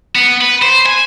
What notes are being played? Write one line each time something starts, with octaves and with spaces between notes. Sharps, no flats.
B3
B4
C5
G#5